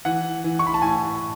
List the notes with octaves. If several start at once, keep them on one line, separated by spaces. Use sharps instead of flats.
E3 F#5
E3
C#6
B5
A5
A2 G#5